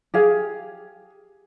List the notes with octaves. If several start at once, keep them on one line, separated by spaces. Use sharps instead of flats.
G4 G#4 F5